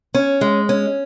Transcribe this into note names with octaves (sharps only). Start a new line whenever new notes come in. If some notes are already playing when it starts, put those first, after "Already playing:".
C#4
G#3
C#4